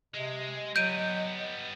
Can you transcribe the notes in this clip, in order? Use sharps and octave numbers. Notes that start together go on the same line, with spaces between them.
C3 G#3 D#5
F#3 G3 B3 G6 D7 D#7